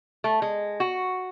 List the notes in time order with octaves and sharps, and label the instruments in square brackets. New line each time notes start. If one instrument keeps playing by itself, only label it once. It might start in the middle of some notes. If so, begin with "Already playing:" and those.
[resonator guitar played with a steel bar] A3
G#3
F#4